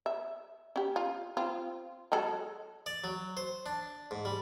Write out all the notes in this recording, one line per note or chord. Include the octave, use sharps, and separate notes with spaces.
E5
C#4 G4
F4
C4 F4
F#3 G#3 A4
D5
F#3
C5
D4
G#2
G3